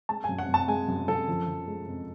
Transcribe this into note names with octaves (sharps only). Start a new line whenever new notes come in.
G#3 A5
G#5
F#2
F#5
F#2
A5
G#3 G#5
F#2
F#2 A4
F3
F3
G#3
F2